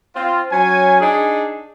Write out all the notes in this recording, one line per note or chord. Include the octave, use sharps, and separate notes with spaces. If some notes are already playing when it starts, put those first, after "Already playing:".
C4 F4
F#3 C#4 G#5
D4 D#4 G#4